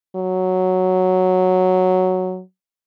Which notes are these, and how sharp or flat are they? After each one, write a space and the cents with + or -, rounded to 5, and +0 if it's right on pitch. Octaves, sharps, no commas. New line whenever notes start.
F#3 +0